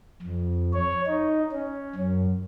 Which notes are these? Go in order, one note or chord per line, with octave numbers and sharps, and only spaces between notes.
F2
C#5
D#4
C#4
F#2